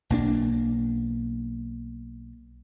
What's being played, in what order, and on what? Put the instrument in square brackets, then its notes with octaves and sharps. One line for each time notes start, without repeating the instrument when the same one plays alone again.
[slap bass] B1 A#3 D4